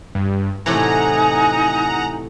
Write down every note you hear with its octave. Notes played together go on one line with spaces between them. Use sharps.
G2
A2 C3 E3 D#4 F#5 G#5 A#5